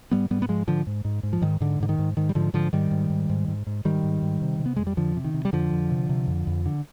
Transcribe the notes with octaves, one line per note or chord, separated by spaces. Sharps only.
G#2 G3 B3
G#2 G3 B3
B3
G#2 F3 G#3
G#2 D3 F3
G#2
G#2
G#2
F3
G#2 D#3
G#2 D3
G#2 D3
D#3
G#2
G#2 D#3
G3
G#2 D3 F3
G#2 D3 F3
G#2 D#3 G3
G#2
G#2
G#2
G#2
G#2
G#2 D#3 G3
G#2
G#2
C3
C3
B3
F2 G#3
G3
F2 D3 F3
C3
D#3
C3
G3
F2 D3 F3
F2
C3
C3
F2
F2
D3